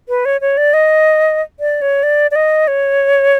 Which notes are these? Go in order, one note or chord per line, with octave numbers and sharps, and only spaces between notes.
B4
C#5
C#5
D5
D#5
D5
C#5
D5
D5
D#5
C#5